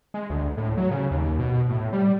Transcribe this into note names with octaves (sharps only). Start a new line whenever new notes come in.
G#3
D2
A2
F#3
C#3
D#2
B2
A2
G3